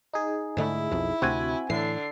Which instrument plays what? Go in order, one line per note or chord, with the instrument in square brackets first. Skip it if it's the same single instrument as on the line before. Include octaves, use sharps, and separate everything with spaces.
[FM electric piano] D#4 G#4
[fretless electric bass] G#2 D3 A3 [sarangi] E4
[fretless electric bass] B1 F2
[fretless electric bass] D2 C3 [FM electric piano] C4 F#4 G#5
[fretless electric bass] A2 E3 [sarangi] D3 [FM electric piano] C7